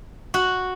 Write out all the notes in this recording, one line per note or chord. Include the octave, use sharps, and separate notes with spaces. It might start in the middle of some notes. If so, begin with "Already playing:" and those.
F#4